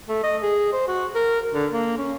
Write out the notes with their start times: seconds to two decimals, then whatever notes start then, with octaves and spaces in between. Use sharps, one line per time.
0.09 A3
0.24 D#5
0.43 G#4
0.73 C5
0.88 F#4
1.15 A#4
1.54 D3
1.72 A#3
1.98 C#4